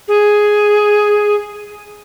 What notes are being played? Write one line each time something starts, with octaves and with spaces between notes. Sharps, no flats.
G#4